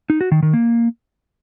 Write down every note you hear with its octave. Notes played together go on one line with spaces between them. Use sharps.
D#4
F#4
D#3
D#3
A#3